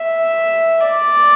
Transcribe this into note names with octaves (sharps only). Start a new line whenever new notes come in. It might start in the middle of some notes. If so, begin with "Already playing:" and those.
Already playing: E5
D5